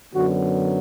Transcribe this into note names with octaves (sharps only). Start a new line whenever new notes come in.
F#2 D3 F#3 B3 F#4